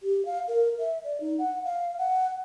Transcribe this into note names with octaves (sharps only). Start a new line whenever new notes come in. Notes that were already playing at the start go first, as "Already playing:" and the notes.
G4
F5
A#4
E5
D5
D#4
F#5
F5
F#5